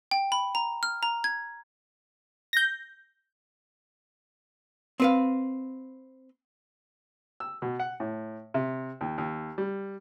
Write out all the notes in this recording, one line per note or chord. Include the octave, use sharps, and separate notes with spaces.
G5
B5
A#5
F6
A#5
G#6
G6 A#6
C4 B4 F5
E6
B2
F#5
A2
C3
D#2
D#2
G3